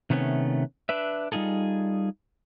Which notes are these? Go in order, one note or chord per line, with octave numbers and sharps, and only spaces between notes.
C3 D#3 A3 B3 C#4
D4 B4 E5
G3 D#4 F4 G#4 A4